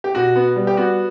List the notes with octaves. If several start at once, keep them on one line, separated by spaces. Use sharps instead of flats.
G4
B2 F#4
B3
G3
G4
B3 F#4